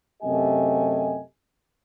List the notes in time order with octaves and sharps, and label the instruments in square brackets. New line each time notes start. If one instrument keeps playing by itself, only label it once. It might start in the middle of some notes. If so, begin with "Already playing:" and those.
[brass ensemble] F#2 C3 A3 G4 D#5 G#5